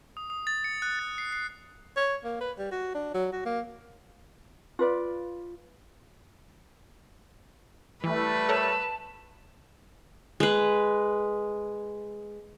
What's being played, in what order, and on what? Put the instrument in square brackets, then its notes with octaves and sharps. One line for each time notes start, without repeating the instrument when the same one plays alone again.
[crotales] D#6
D#6
A6
C#7
F#6
A6
C7
C7
[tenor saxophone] C#5
A#3
B4
G3
F#4
D4
F#3
F#4
A#3
[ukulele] F4 B4 D5
[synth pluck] E3 [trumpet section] G3 A3 [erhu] B4
[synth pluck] A4 A#4 C#5 [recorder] A5
[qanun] G#3 B4